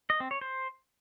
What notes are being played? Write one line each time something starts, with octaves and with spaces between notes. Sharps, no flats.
D#5
C4
C#5
C5